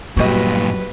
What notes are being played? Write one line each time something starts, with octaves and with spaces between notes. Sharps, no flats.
G2 A#2 F#3 A#3 F#4 G4 B4 D#5